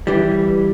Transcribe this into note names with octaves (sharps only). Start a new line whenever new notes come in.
E3 G3